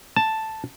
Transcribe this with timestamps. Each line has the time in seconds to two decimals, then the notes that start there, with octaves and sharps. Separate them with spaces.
0.16 A5